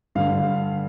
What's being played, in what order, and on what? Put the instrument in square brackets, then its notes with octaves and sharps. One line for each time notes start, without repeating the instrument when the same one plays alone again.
[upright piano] G2 D3 F5